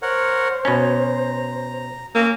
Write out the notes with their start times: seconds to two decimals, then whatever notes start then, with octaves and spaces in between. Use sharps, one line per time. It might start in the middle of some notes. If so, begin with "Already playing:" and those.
0.02 A#4 C5 C#5 F#5
0.65 B2 C#4 A#5
2.15 A#3 C#4 A#5 E6